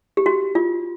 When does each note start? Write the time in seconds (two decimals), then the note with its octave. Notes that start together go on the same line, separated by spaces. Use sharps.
0.17 G4
0.26 F#4
0.55 F4